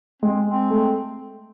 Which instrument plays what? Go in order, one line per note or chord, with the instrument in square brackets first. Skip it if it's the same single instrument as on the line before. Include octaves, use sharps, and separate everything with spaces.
[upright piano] G#3 [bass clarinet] C4
[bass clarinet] C4
[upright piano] A3